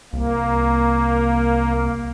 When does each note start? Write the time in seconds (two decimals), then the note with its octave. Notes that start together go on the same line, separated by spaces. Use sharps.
0.13 C2 A#3